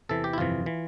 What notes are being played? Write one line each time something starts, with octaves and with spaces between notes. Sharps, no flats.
E2 C3 E3 A4
G4
E4
G1 F2 C3 E3 F4
E3